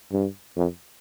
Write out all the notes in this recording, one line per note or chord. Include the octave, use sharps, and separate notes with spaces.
G2
F2